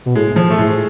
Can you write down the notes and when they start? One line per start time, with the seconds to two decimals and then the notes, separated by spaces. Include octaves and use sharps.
0.06 B2
0.15 A2 G#3
0.36 F3
0.51 A3
0.58 A2 G#3